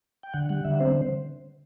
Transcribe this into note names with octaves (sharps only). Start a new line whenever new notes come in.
G5
D3 F#5
G3 F#5
D3 E5
C4 C5